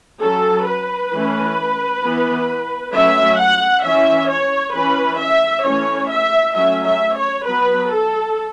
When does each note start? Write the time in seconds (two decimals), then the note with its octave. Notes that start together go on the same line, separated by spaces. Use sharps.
0.22 F#3 C#4 A4
0.67 B4
1.13 E3 A3 C#4
2.03 E3 B3
2.94 F#3 A3 C#4 E5
3.39 F#5
3.85 E3 C#4 E5
4.30 C#5
4.75 E3 C#4 B4
5.20 E5
5.66 E3 A3 C#4 C#5
6.11 E5
6.56 F#3 A3 C#4 E5
6.86 E5
7.17 C#5
7.47 F#3 B3 B4
7.93 A4